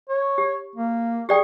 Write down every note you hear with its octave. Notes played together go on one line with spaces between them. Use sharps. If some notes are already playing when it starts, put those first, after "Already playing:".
C#5
G4
A#3
G4 G#4 D5 G5